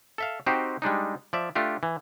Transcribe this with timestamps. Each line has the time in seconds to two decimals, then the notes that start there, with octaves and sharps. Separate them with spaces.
0.18 A4 E5 F5
0.46 C4 D#4 F#4 G4 C5
0.82 G3 G#3 D4 D#4
1.33 F3 D5 E5
1.55 A3 D4 F4 G4
1.83 E3